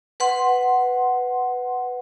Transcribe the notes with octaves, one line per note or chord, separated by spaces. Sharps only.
B4 F#5 C6